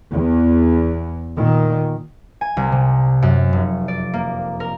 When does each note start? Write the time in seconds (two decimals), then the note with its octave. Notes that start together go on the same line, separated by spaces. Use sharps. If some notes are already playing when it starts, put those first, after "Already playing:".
0.12 E2
1.36 A#2 D#3
2.41 G#5
2.57 C2
2.72 C3
3.22 F#2
3.53 F1
3.88 D5
4.14 A#3
4.60 A#4